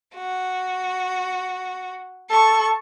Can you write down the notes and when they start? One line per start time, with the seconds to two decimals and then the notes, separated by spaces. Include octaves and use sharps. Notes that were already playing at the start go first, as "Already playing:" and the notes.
0.15 F#4
2.30 A4 C#6